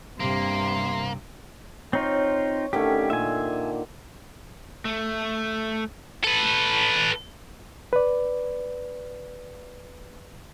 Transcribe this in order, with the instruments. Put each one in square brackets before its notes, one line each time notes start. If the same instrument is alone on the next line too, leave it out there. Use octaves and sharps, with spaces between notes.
[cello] G2 [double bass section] C3 [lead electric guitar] A#3 [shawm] C6
[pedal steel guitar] C4 D#4 F4 [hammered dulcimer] C#5
[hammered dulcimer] D3 D#3 A3 [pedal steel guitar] C#4 G4
[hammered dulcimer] A#2 [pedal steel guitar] E5 G#5
[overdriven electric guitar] A3
[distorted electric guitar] A4 B4
[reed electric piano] B4 D5